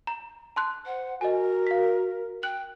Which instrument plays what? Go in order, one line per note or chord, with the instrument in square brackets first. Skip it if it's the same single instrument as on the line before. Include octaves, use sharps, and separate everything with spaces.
[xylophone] A#5
A5 C6 F#6
[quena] C5 [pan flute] F#5
[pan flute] F#4 [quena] A#4 [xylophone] D#5 G#5
[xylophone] F5 B6
[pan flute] G5 [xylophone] F#6 F#7